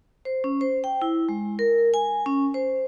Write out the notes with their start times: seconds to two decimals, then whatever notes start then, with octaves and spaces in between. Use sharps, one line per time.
0.25 C5
0.44 C#4
0.61 C5
0.84 G5
1.02 E4
1.29 G#3
1.59 A#4
1.94 G#5
2.26 C#4
2.54 C5